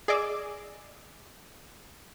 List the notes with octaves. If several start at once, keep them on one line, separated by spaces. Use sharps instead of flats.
G#4 D5 D#5 D6 E6